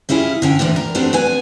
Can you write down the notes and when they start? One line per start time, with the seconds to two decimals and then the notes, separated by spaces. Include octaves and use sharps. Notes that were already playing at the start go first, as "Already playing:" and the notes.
0.09 G3 C#4 E4 F4 G#4
0.42 D3 C#4 G5
0.59 D2 A#2 D3 E3
0.76 A#4
0.95 G3 A3 B3 C4 D4
1.13 B3 B4 G#5